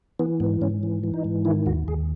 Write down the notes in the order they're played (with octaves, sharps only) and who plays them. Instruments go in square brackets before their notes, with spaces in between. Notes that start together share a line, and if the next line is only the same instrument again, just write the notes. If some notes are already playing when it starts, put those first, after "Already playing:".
[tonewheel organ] E3 B3
G#2 B3
G#2 C#4
E3
E3
D#4
G#2
D#3 E4
D#2 F#4
D#2 G#4